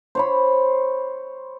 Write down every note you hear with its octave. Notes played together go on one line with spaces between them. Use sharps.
C5 C#5 B5